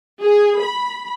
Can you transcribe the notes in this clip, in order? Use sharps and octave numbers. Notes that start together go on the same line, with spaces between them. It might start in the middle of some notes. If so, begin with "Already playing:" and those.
G#4
B5